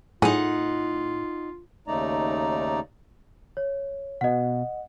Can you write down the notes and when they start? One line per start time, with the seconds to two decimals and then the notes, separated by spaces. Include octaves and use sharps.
0.22 A2 D#4 F4 G#4 F#5
1.88 D#2 C#3 A3 D#4 D5 A#5
3.57 C#5
4.21 B2 D#5 F#5